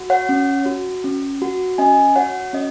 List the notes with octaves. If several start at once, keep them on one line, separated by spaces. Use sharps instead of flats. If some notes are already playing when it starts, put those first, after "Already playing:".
Already playing: F#4
C#5 F#5
C#4
F#4
C#4
F#4
C#4 D#5 G#5
F#4 C#5 F#5
C#4 D#5